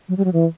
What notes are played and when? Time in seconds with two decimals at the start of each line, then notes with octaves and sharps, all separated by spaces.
0.09 F#3
0.17 G3
0.25 F#3
0.33 E3